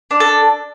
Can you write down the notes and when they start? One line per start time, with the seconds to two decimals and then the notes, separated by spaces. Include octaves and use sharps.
0.11 D4
0.20 A4